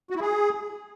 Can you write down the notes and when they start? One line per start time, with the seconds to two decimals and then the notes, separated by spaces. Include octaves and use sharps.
0.10 F#4
0.16 E4
0.21 G#4